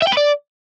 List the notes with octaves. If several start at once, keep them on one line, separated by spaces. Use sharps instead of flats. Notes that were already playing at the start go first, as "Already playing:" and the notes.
E5
G5
B4
D5